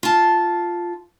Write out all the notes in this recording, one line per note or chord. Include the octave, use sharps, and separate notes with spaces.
F4 A5